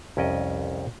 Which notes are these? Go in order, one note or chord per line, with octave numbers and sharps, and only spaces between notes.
C2 F2 C#4 D5 D#5